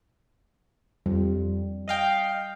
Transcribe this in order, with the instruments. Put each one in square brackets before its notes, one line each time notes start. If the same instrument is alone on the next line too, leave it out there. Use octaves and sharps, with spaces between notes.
[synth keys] F2 [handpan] G3
[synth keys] D#5 F5 G5